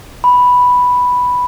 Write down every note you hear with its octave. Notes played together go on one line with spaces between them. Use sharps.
B5